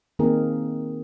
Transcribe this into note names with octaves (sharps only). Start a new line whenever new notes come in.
D#3 A#3 C4 D#4 G#4 A#4